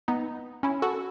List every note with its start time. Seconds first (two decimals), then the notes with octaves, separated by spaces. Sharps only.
0.08 B3 D#4
0.63 C#4 E4
0.82 F#4 A4